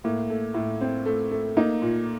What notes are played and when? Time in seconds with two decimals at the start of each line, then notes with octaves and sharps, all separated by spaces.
0.04 A2 A#3
0.30 A3
0.54 A2
0.81 C4
1.06 A3
1.31 A3
1.57 A#3 D#4
1.82 A#2